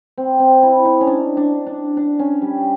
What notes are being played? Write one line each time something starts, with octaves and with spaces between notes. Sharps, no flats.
C4
C4
E4
D#4
C#4
D4
D4
D4
D4
C#4
G3